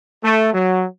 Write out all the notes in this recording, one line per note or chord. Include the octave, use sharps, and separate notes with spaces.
A3
F#3